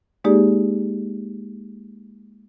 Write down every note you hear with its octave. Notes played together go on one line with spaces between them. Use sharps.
G#3 A#3 D#4 G4 G#4 D5